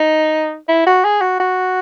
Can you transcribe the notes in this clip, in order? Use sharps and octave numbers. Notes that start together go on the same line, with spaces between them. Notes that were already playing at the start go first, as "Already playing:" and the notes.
Already playing: D#4
E4
F#4
G#4
F#4
F#4